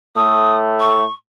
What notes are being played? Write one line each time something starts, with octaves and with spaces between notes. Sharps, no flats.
A2 A3 D#6
C#6